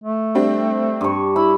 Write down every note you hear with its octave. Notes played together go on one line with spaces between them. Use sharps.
A3
G3 C4 D4
G2 C#6
E4 B5